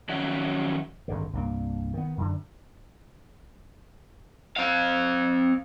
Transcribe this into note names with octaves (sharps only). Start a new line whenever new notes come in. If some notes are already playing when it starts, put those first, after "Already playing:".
D#3 F3 F#3 C#4 E5 F#5
G#1 G2 D3
C2 G2 A#3
D#3 B3
F#2 D3
C4 F5